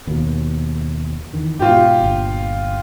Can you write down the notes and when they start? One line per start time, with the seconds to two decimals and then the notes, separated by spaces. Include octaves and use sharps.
0.07 D#2 B2
1.33 E2 D#3
1.59 G#2 B2 F4 G4
2.02 G1 A#2